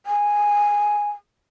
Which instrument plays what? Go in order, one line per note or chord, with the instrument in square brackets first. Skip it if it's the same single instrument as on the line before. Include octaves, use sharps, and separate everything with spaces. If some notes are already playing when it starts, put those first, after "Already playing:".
[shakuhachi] G#5